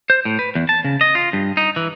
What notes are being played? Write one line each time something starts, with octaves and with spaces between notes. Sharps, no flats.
C5
A2
B4
E2
A5
C#3
D#5
F4
G2
D#4
E3